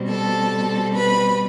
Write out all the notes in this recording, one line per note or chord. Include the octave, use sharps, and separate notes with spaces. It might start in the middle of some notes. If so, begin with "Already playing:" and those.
Already playing: B2 G3 C4
A4 A5
B4 B5